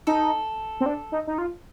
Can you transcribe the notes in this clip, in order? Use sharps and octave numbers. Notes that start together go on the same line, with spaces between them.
D#4 A4
C4
D4
D#4
D#4
F4